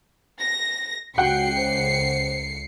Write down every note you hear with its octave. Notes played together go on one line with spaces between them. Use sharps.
A#6
C#2 F#4 F#5 G5 C7 C#7
C5